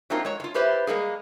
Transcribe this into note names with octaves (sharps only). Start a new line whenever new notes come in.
F#3 A3 A#3 C4 D#4 F4
G#3 C#5
A2 F4
E4 G4 B4 C5 D5 E5
G3 G#3 A#3 G#4